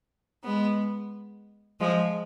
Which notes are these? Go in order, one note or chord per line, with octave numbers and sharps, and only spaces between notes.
G#3 B3
F3 G#3